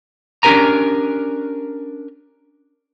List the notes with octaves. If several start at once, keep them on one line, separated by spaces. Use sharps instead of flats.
C#4 D4 G4 A#4 G#5 A#5